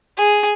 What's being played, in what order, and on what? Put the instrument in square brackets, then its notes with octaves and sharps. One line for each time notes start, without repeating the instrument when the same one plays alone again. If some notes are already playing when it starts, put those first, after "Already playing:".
[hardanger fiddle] G#4